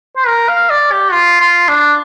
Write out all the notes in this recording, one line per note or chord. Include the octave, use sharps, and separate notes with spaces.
C5
A#4
F5
D5
G4
F4
F4
D4